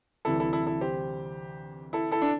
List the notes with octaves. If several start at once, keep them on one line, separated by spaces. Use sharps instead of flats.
D2 C3 E3 G3 E4 A4
E4 A4
E4 A4
E4 A4
G4 C5
E4 A4
E4 A4
D4